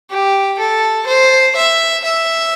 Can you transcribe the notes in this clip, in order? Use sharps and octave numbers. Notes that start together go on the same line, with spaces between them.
G4
A4
C5
E5
E5